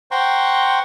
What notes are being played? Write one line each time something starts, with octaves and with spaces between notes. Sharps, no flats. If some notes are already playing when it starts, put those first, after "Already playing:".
C5 F#5 G5 A#5 C6 C#6